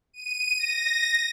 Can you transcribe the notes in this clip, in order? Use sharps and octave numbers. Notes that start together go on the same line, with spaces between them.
D#7
A#6